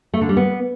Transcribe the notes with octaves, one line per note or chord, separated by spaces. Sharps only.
A3
D3
G3
B3